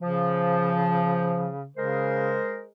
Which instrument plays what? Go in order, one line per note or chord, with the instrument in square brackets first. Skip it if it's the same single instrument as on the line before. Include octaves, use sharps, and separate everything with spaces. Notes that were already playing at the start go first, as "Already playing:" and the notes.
[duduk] C#3 [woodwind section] F3
[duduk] C#3 [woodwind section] G#3 A#4 C5